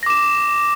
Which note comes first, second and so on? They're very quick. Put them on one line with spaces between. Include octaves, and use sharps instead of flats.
A#6 D6 E7